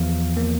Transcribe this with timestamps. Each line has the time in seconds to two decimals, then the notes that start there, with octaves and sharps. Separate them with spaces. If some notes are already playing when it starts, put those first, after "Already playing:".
Already playing: E2 F3 F5
0.37 A#3